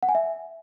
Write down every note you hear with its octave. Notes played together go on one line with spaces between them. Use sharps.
F#5
G#5
E5